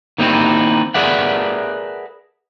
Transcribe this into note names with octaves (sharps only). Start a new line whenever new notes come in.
D#3 A#3 C4 D#4 E4
G#4 A#4 B4 D5 E5 F#5